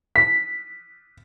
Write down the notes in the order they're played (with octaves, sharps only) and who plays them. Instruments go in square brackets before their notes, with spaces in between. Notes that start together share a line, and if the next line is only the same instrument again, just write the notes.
[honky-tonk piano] B6